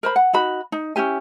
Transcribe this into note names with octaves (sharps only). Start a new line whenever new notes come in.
A#4 C5 B5
F#5
D#4 F#4 B5
D#4
C#4 E4 G4 G#5